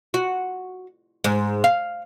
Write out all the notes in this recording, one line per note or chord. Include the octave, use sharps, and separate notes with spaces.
F#4
G#2
F5